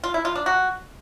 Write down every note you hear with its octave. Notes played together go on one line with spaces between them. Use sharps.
F4
E4
F4
D4
F#4